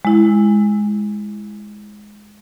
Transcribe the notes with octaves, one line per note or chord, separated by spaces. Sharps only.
G#3 E4